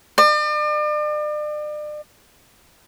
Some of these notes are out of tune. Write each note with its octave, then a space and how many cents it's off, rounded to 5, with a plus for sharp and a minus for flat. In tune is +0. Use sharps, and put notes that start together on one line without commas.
D5 +40